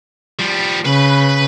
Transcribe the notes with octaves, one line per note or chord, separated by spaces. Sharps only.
F3 G3
C#3 B4 B5